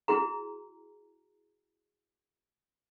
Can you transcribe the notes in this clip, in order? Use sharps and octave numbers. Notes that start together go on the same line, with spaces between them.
E4 F#4 G#4 A#5